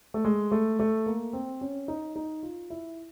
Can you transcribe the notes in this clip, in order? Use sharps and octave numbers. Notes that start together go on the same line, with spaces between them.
A3
G#3
A3
A3
A#3
C4
C#4
D#4
D#4
F4
E4